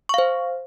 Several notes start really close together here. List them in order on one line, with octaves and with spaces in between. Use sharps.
C#6 F5 C5